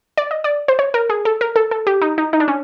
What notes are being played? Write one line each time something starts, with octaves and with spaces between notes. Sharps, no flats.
D5
D#5
D5
C5
C#5
A#4
G#4
A4
A#4
A4
A4
G4
D#4
D#4
D#4
D4
C#4